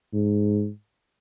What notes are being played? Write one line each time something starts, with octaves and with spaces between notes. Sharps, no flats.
G#2